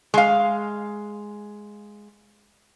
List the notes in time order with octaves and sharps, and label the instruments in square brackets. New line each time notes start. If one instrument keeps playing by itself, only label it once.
[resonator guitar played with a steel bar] G#3 F5